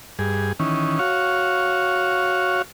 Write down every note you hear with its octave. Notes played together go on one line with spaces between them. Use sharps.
G2 G#4
D#3 E3 C#4
F#4 C#5 F5